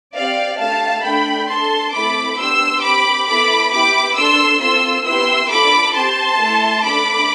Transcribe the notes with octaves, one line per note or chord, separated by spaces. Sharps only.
C4 G4 D5 F5
A3 D4 G4 F5 A5
A3 D4 A4 G5 B5
D4 A4 A5 C6
A3 C4 E4 A4 B5 D6
B3 D4 G4 C6 E6
C4 G4 B5 D6
B3 E4 A4 B5 D6
B3 E4 G4 B5 D6
D4 A4 C6 E6
C4 F4 A4 C6 E6
B3 E4 G4 C6 E6
D4 F4 A4 B5 D6
C4 G4 A5 C6
A3 E4 A4
A3 D4 A4 B5 D6